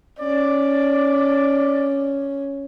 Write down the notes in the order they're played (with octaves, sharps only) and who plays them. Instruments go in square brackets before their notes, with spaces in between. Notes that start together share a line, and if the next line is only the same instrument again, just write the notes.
[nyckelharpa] C#4 [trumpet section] D5